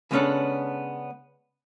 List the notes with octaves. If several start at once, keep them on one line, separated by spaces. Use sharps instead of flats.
C#3 G#3 B3 C#4 D4 A4